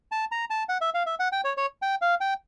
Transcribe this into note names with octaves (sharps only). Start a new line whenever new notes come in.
A5
A#5
A5
F#5
E5
F5
E5
F#5
G5
C#5
C#5
G5
F5
G5